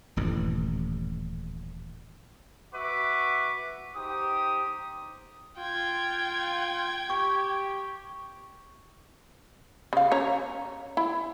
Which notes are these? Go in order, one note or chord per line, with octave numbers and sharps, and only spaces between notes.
D#1 A1 G2
F#4 B4 E5 F#5 C#6 D6
D#4 G4 C5 D#6
F4 G5 G#6
G4 C#6
C#3 F5
C#4 C#5 A#5
E4